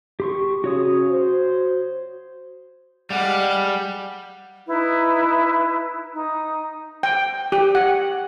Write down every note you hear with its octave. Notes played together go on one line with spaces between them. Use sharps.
G4 C6 C#6
C#3 F#4 C#5 D#6
C5
G3 G#3 G4 F5 F#5
D#4 E4 B4
D#4
G5
G4
F#5